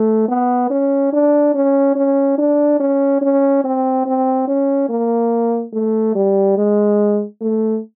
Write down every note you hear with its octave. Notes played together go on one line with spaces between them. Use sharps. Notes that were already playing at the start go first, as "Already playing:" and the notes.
Already playing: A3
B3
C#4
D4
C#4
C#4
D4
C#4
C#4
C4
C4
C#4
A#3
A3
G3
G#3
A3